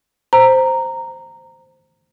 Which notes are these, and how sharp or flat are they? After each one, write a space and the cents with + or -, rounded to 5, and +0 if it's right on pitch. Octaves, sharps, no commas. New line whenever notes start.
C5 +0 A#5 -10